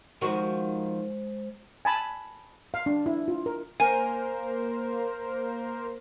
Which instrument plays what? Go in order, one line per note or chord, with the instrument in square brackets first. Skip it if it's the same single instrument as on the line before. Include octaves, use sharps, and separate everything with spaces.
[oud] D#3 F3 F#4 [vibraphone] G#3 C5
[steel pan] G#5 A5 B5
F5
D4
E4
F4
A#4
[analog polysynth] A#3 A#4 C5 [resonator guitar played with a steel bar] G#5